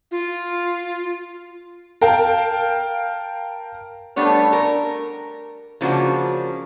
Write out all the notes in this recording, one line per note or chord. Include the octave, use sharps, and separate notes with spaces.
F4
A#4 F5 G5 A5
G3 A3 B3 D4 C#5
A#4
C#3 F3 A#3 D4 E4 F#4